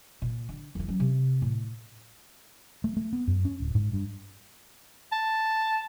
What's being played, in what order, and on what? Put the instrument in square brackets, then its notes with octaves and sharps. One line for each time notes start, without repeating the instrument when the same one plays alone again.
[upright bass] A#2
D3
F2 D#3
F#3 C#4
C3
A2
[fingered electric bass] A3
A3
B3
F#2
C#4
D1
G#2
G2
[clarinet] A5